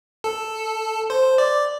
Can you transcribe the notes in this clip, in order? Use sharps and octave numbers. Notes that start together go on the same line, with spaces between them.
A4
C5
D5